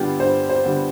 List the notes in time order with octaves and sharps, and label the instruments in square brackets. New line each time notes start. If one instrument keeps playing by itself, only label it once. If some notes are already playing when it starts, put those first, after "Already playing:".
Already playing: [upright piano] G2 D3 G3 B3 F4 G4
G2 C5
C5
D3 G3 B3